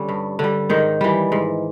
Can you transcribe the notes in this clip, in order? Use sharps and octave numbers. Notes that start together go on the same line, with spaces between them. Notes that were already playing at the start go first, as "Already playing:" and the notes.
Already playing: D3 G3 C#4
G2
D3 G3
G#2 D#3 D#4
E3 G3
G#2